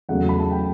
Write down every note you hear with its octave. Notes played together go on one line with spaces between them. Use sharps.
E2 C#3 F#3 A3 F#5
B5
A5
G5